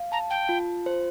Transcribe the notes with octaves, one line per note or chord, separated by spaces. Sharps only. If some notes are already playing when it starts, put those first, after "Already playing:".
Already playing: F5
A5 A#5
G5
F4
C5